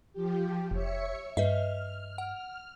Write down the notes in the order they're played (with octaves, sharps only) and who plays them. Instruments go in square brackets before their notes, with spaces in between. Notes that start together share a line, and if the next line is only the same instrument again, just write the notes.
[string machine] F3 G4
[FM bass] F1 [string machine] C#5 E5 C#7
[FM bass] G2 [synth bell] B4 D#5 E5 [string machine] F6
[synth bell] F#5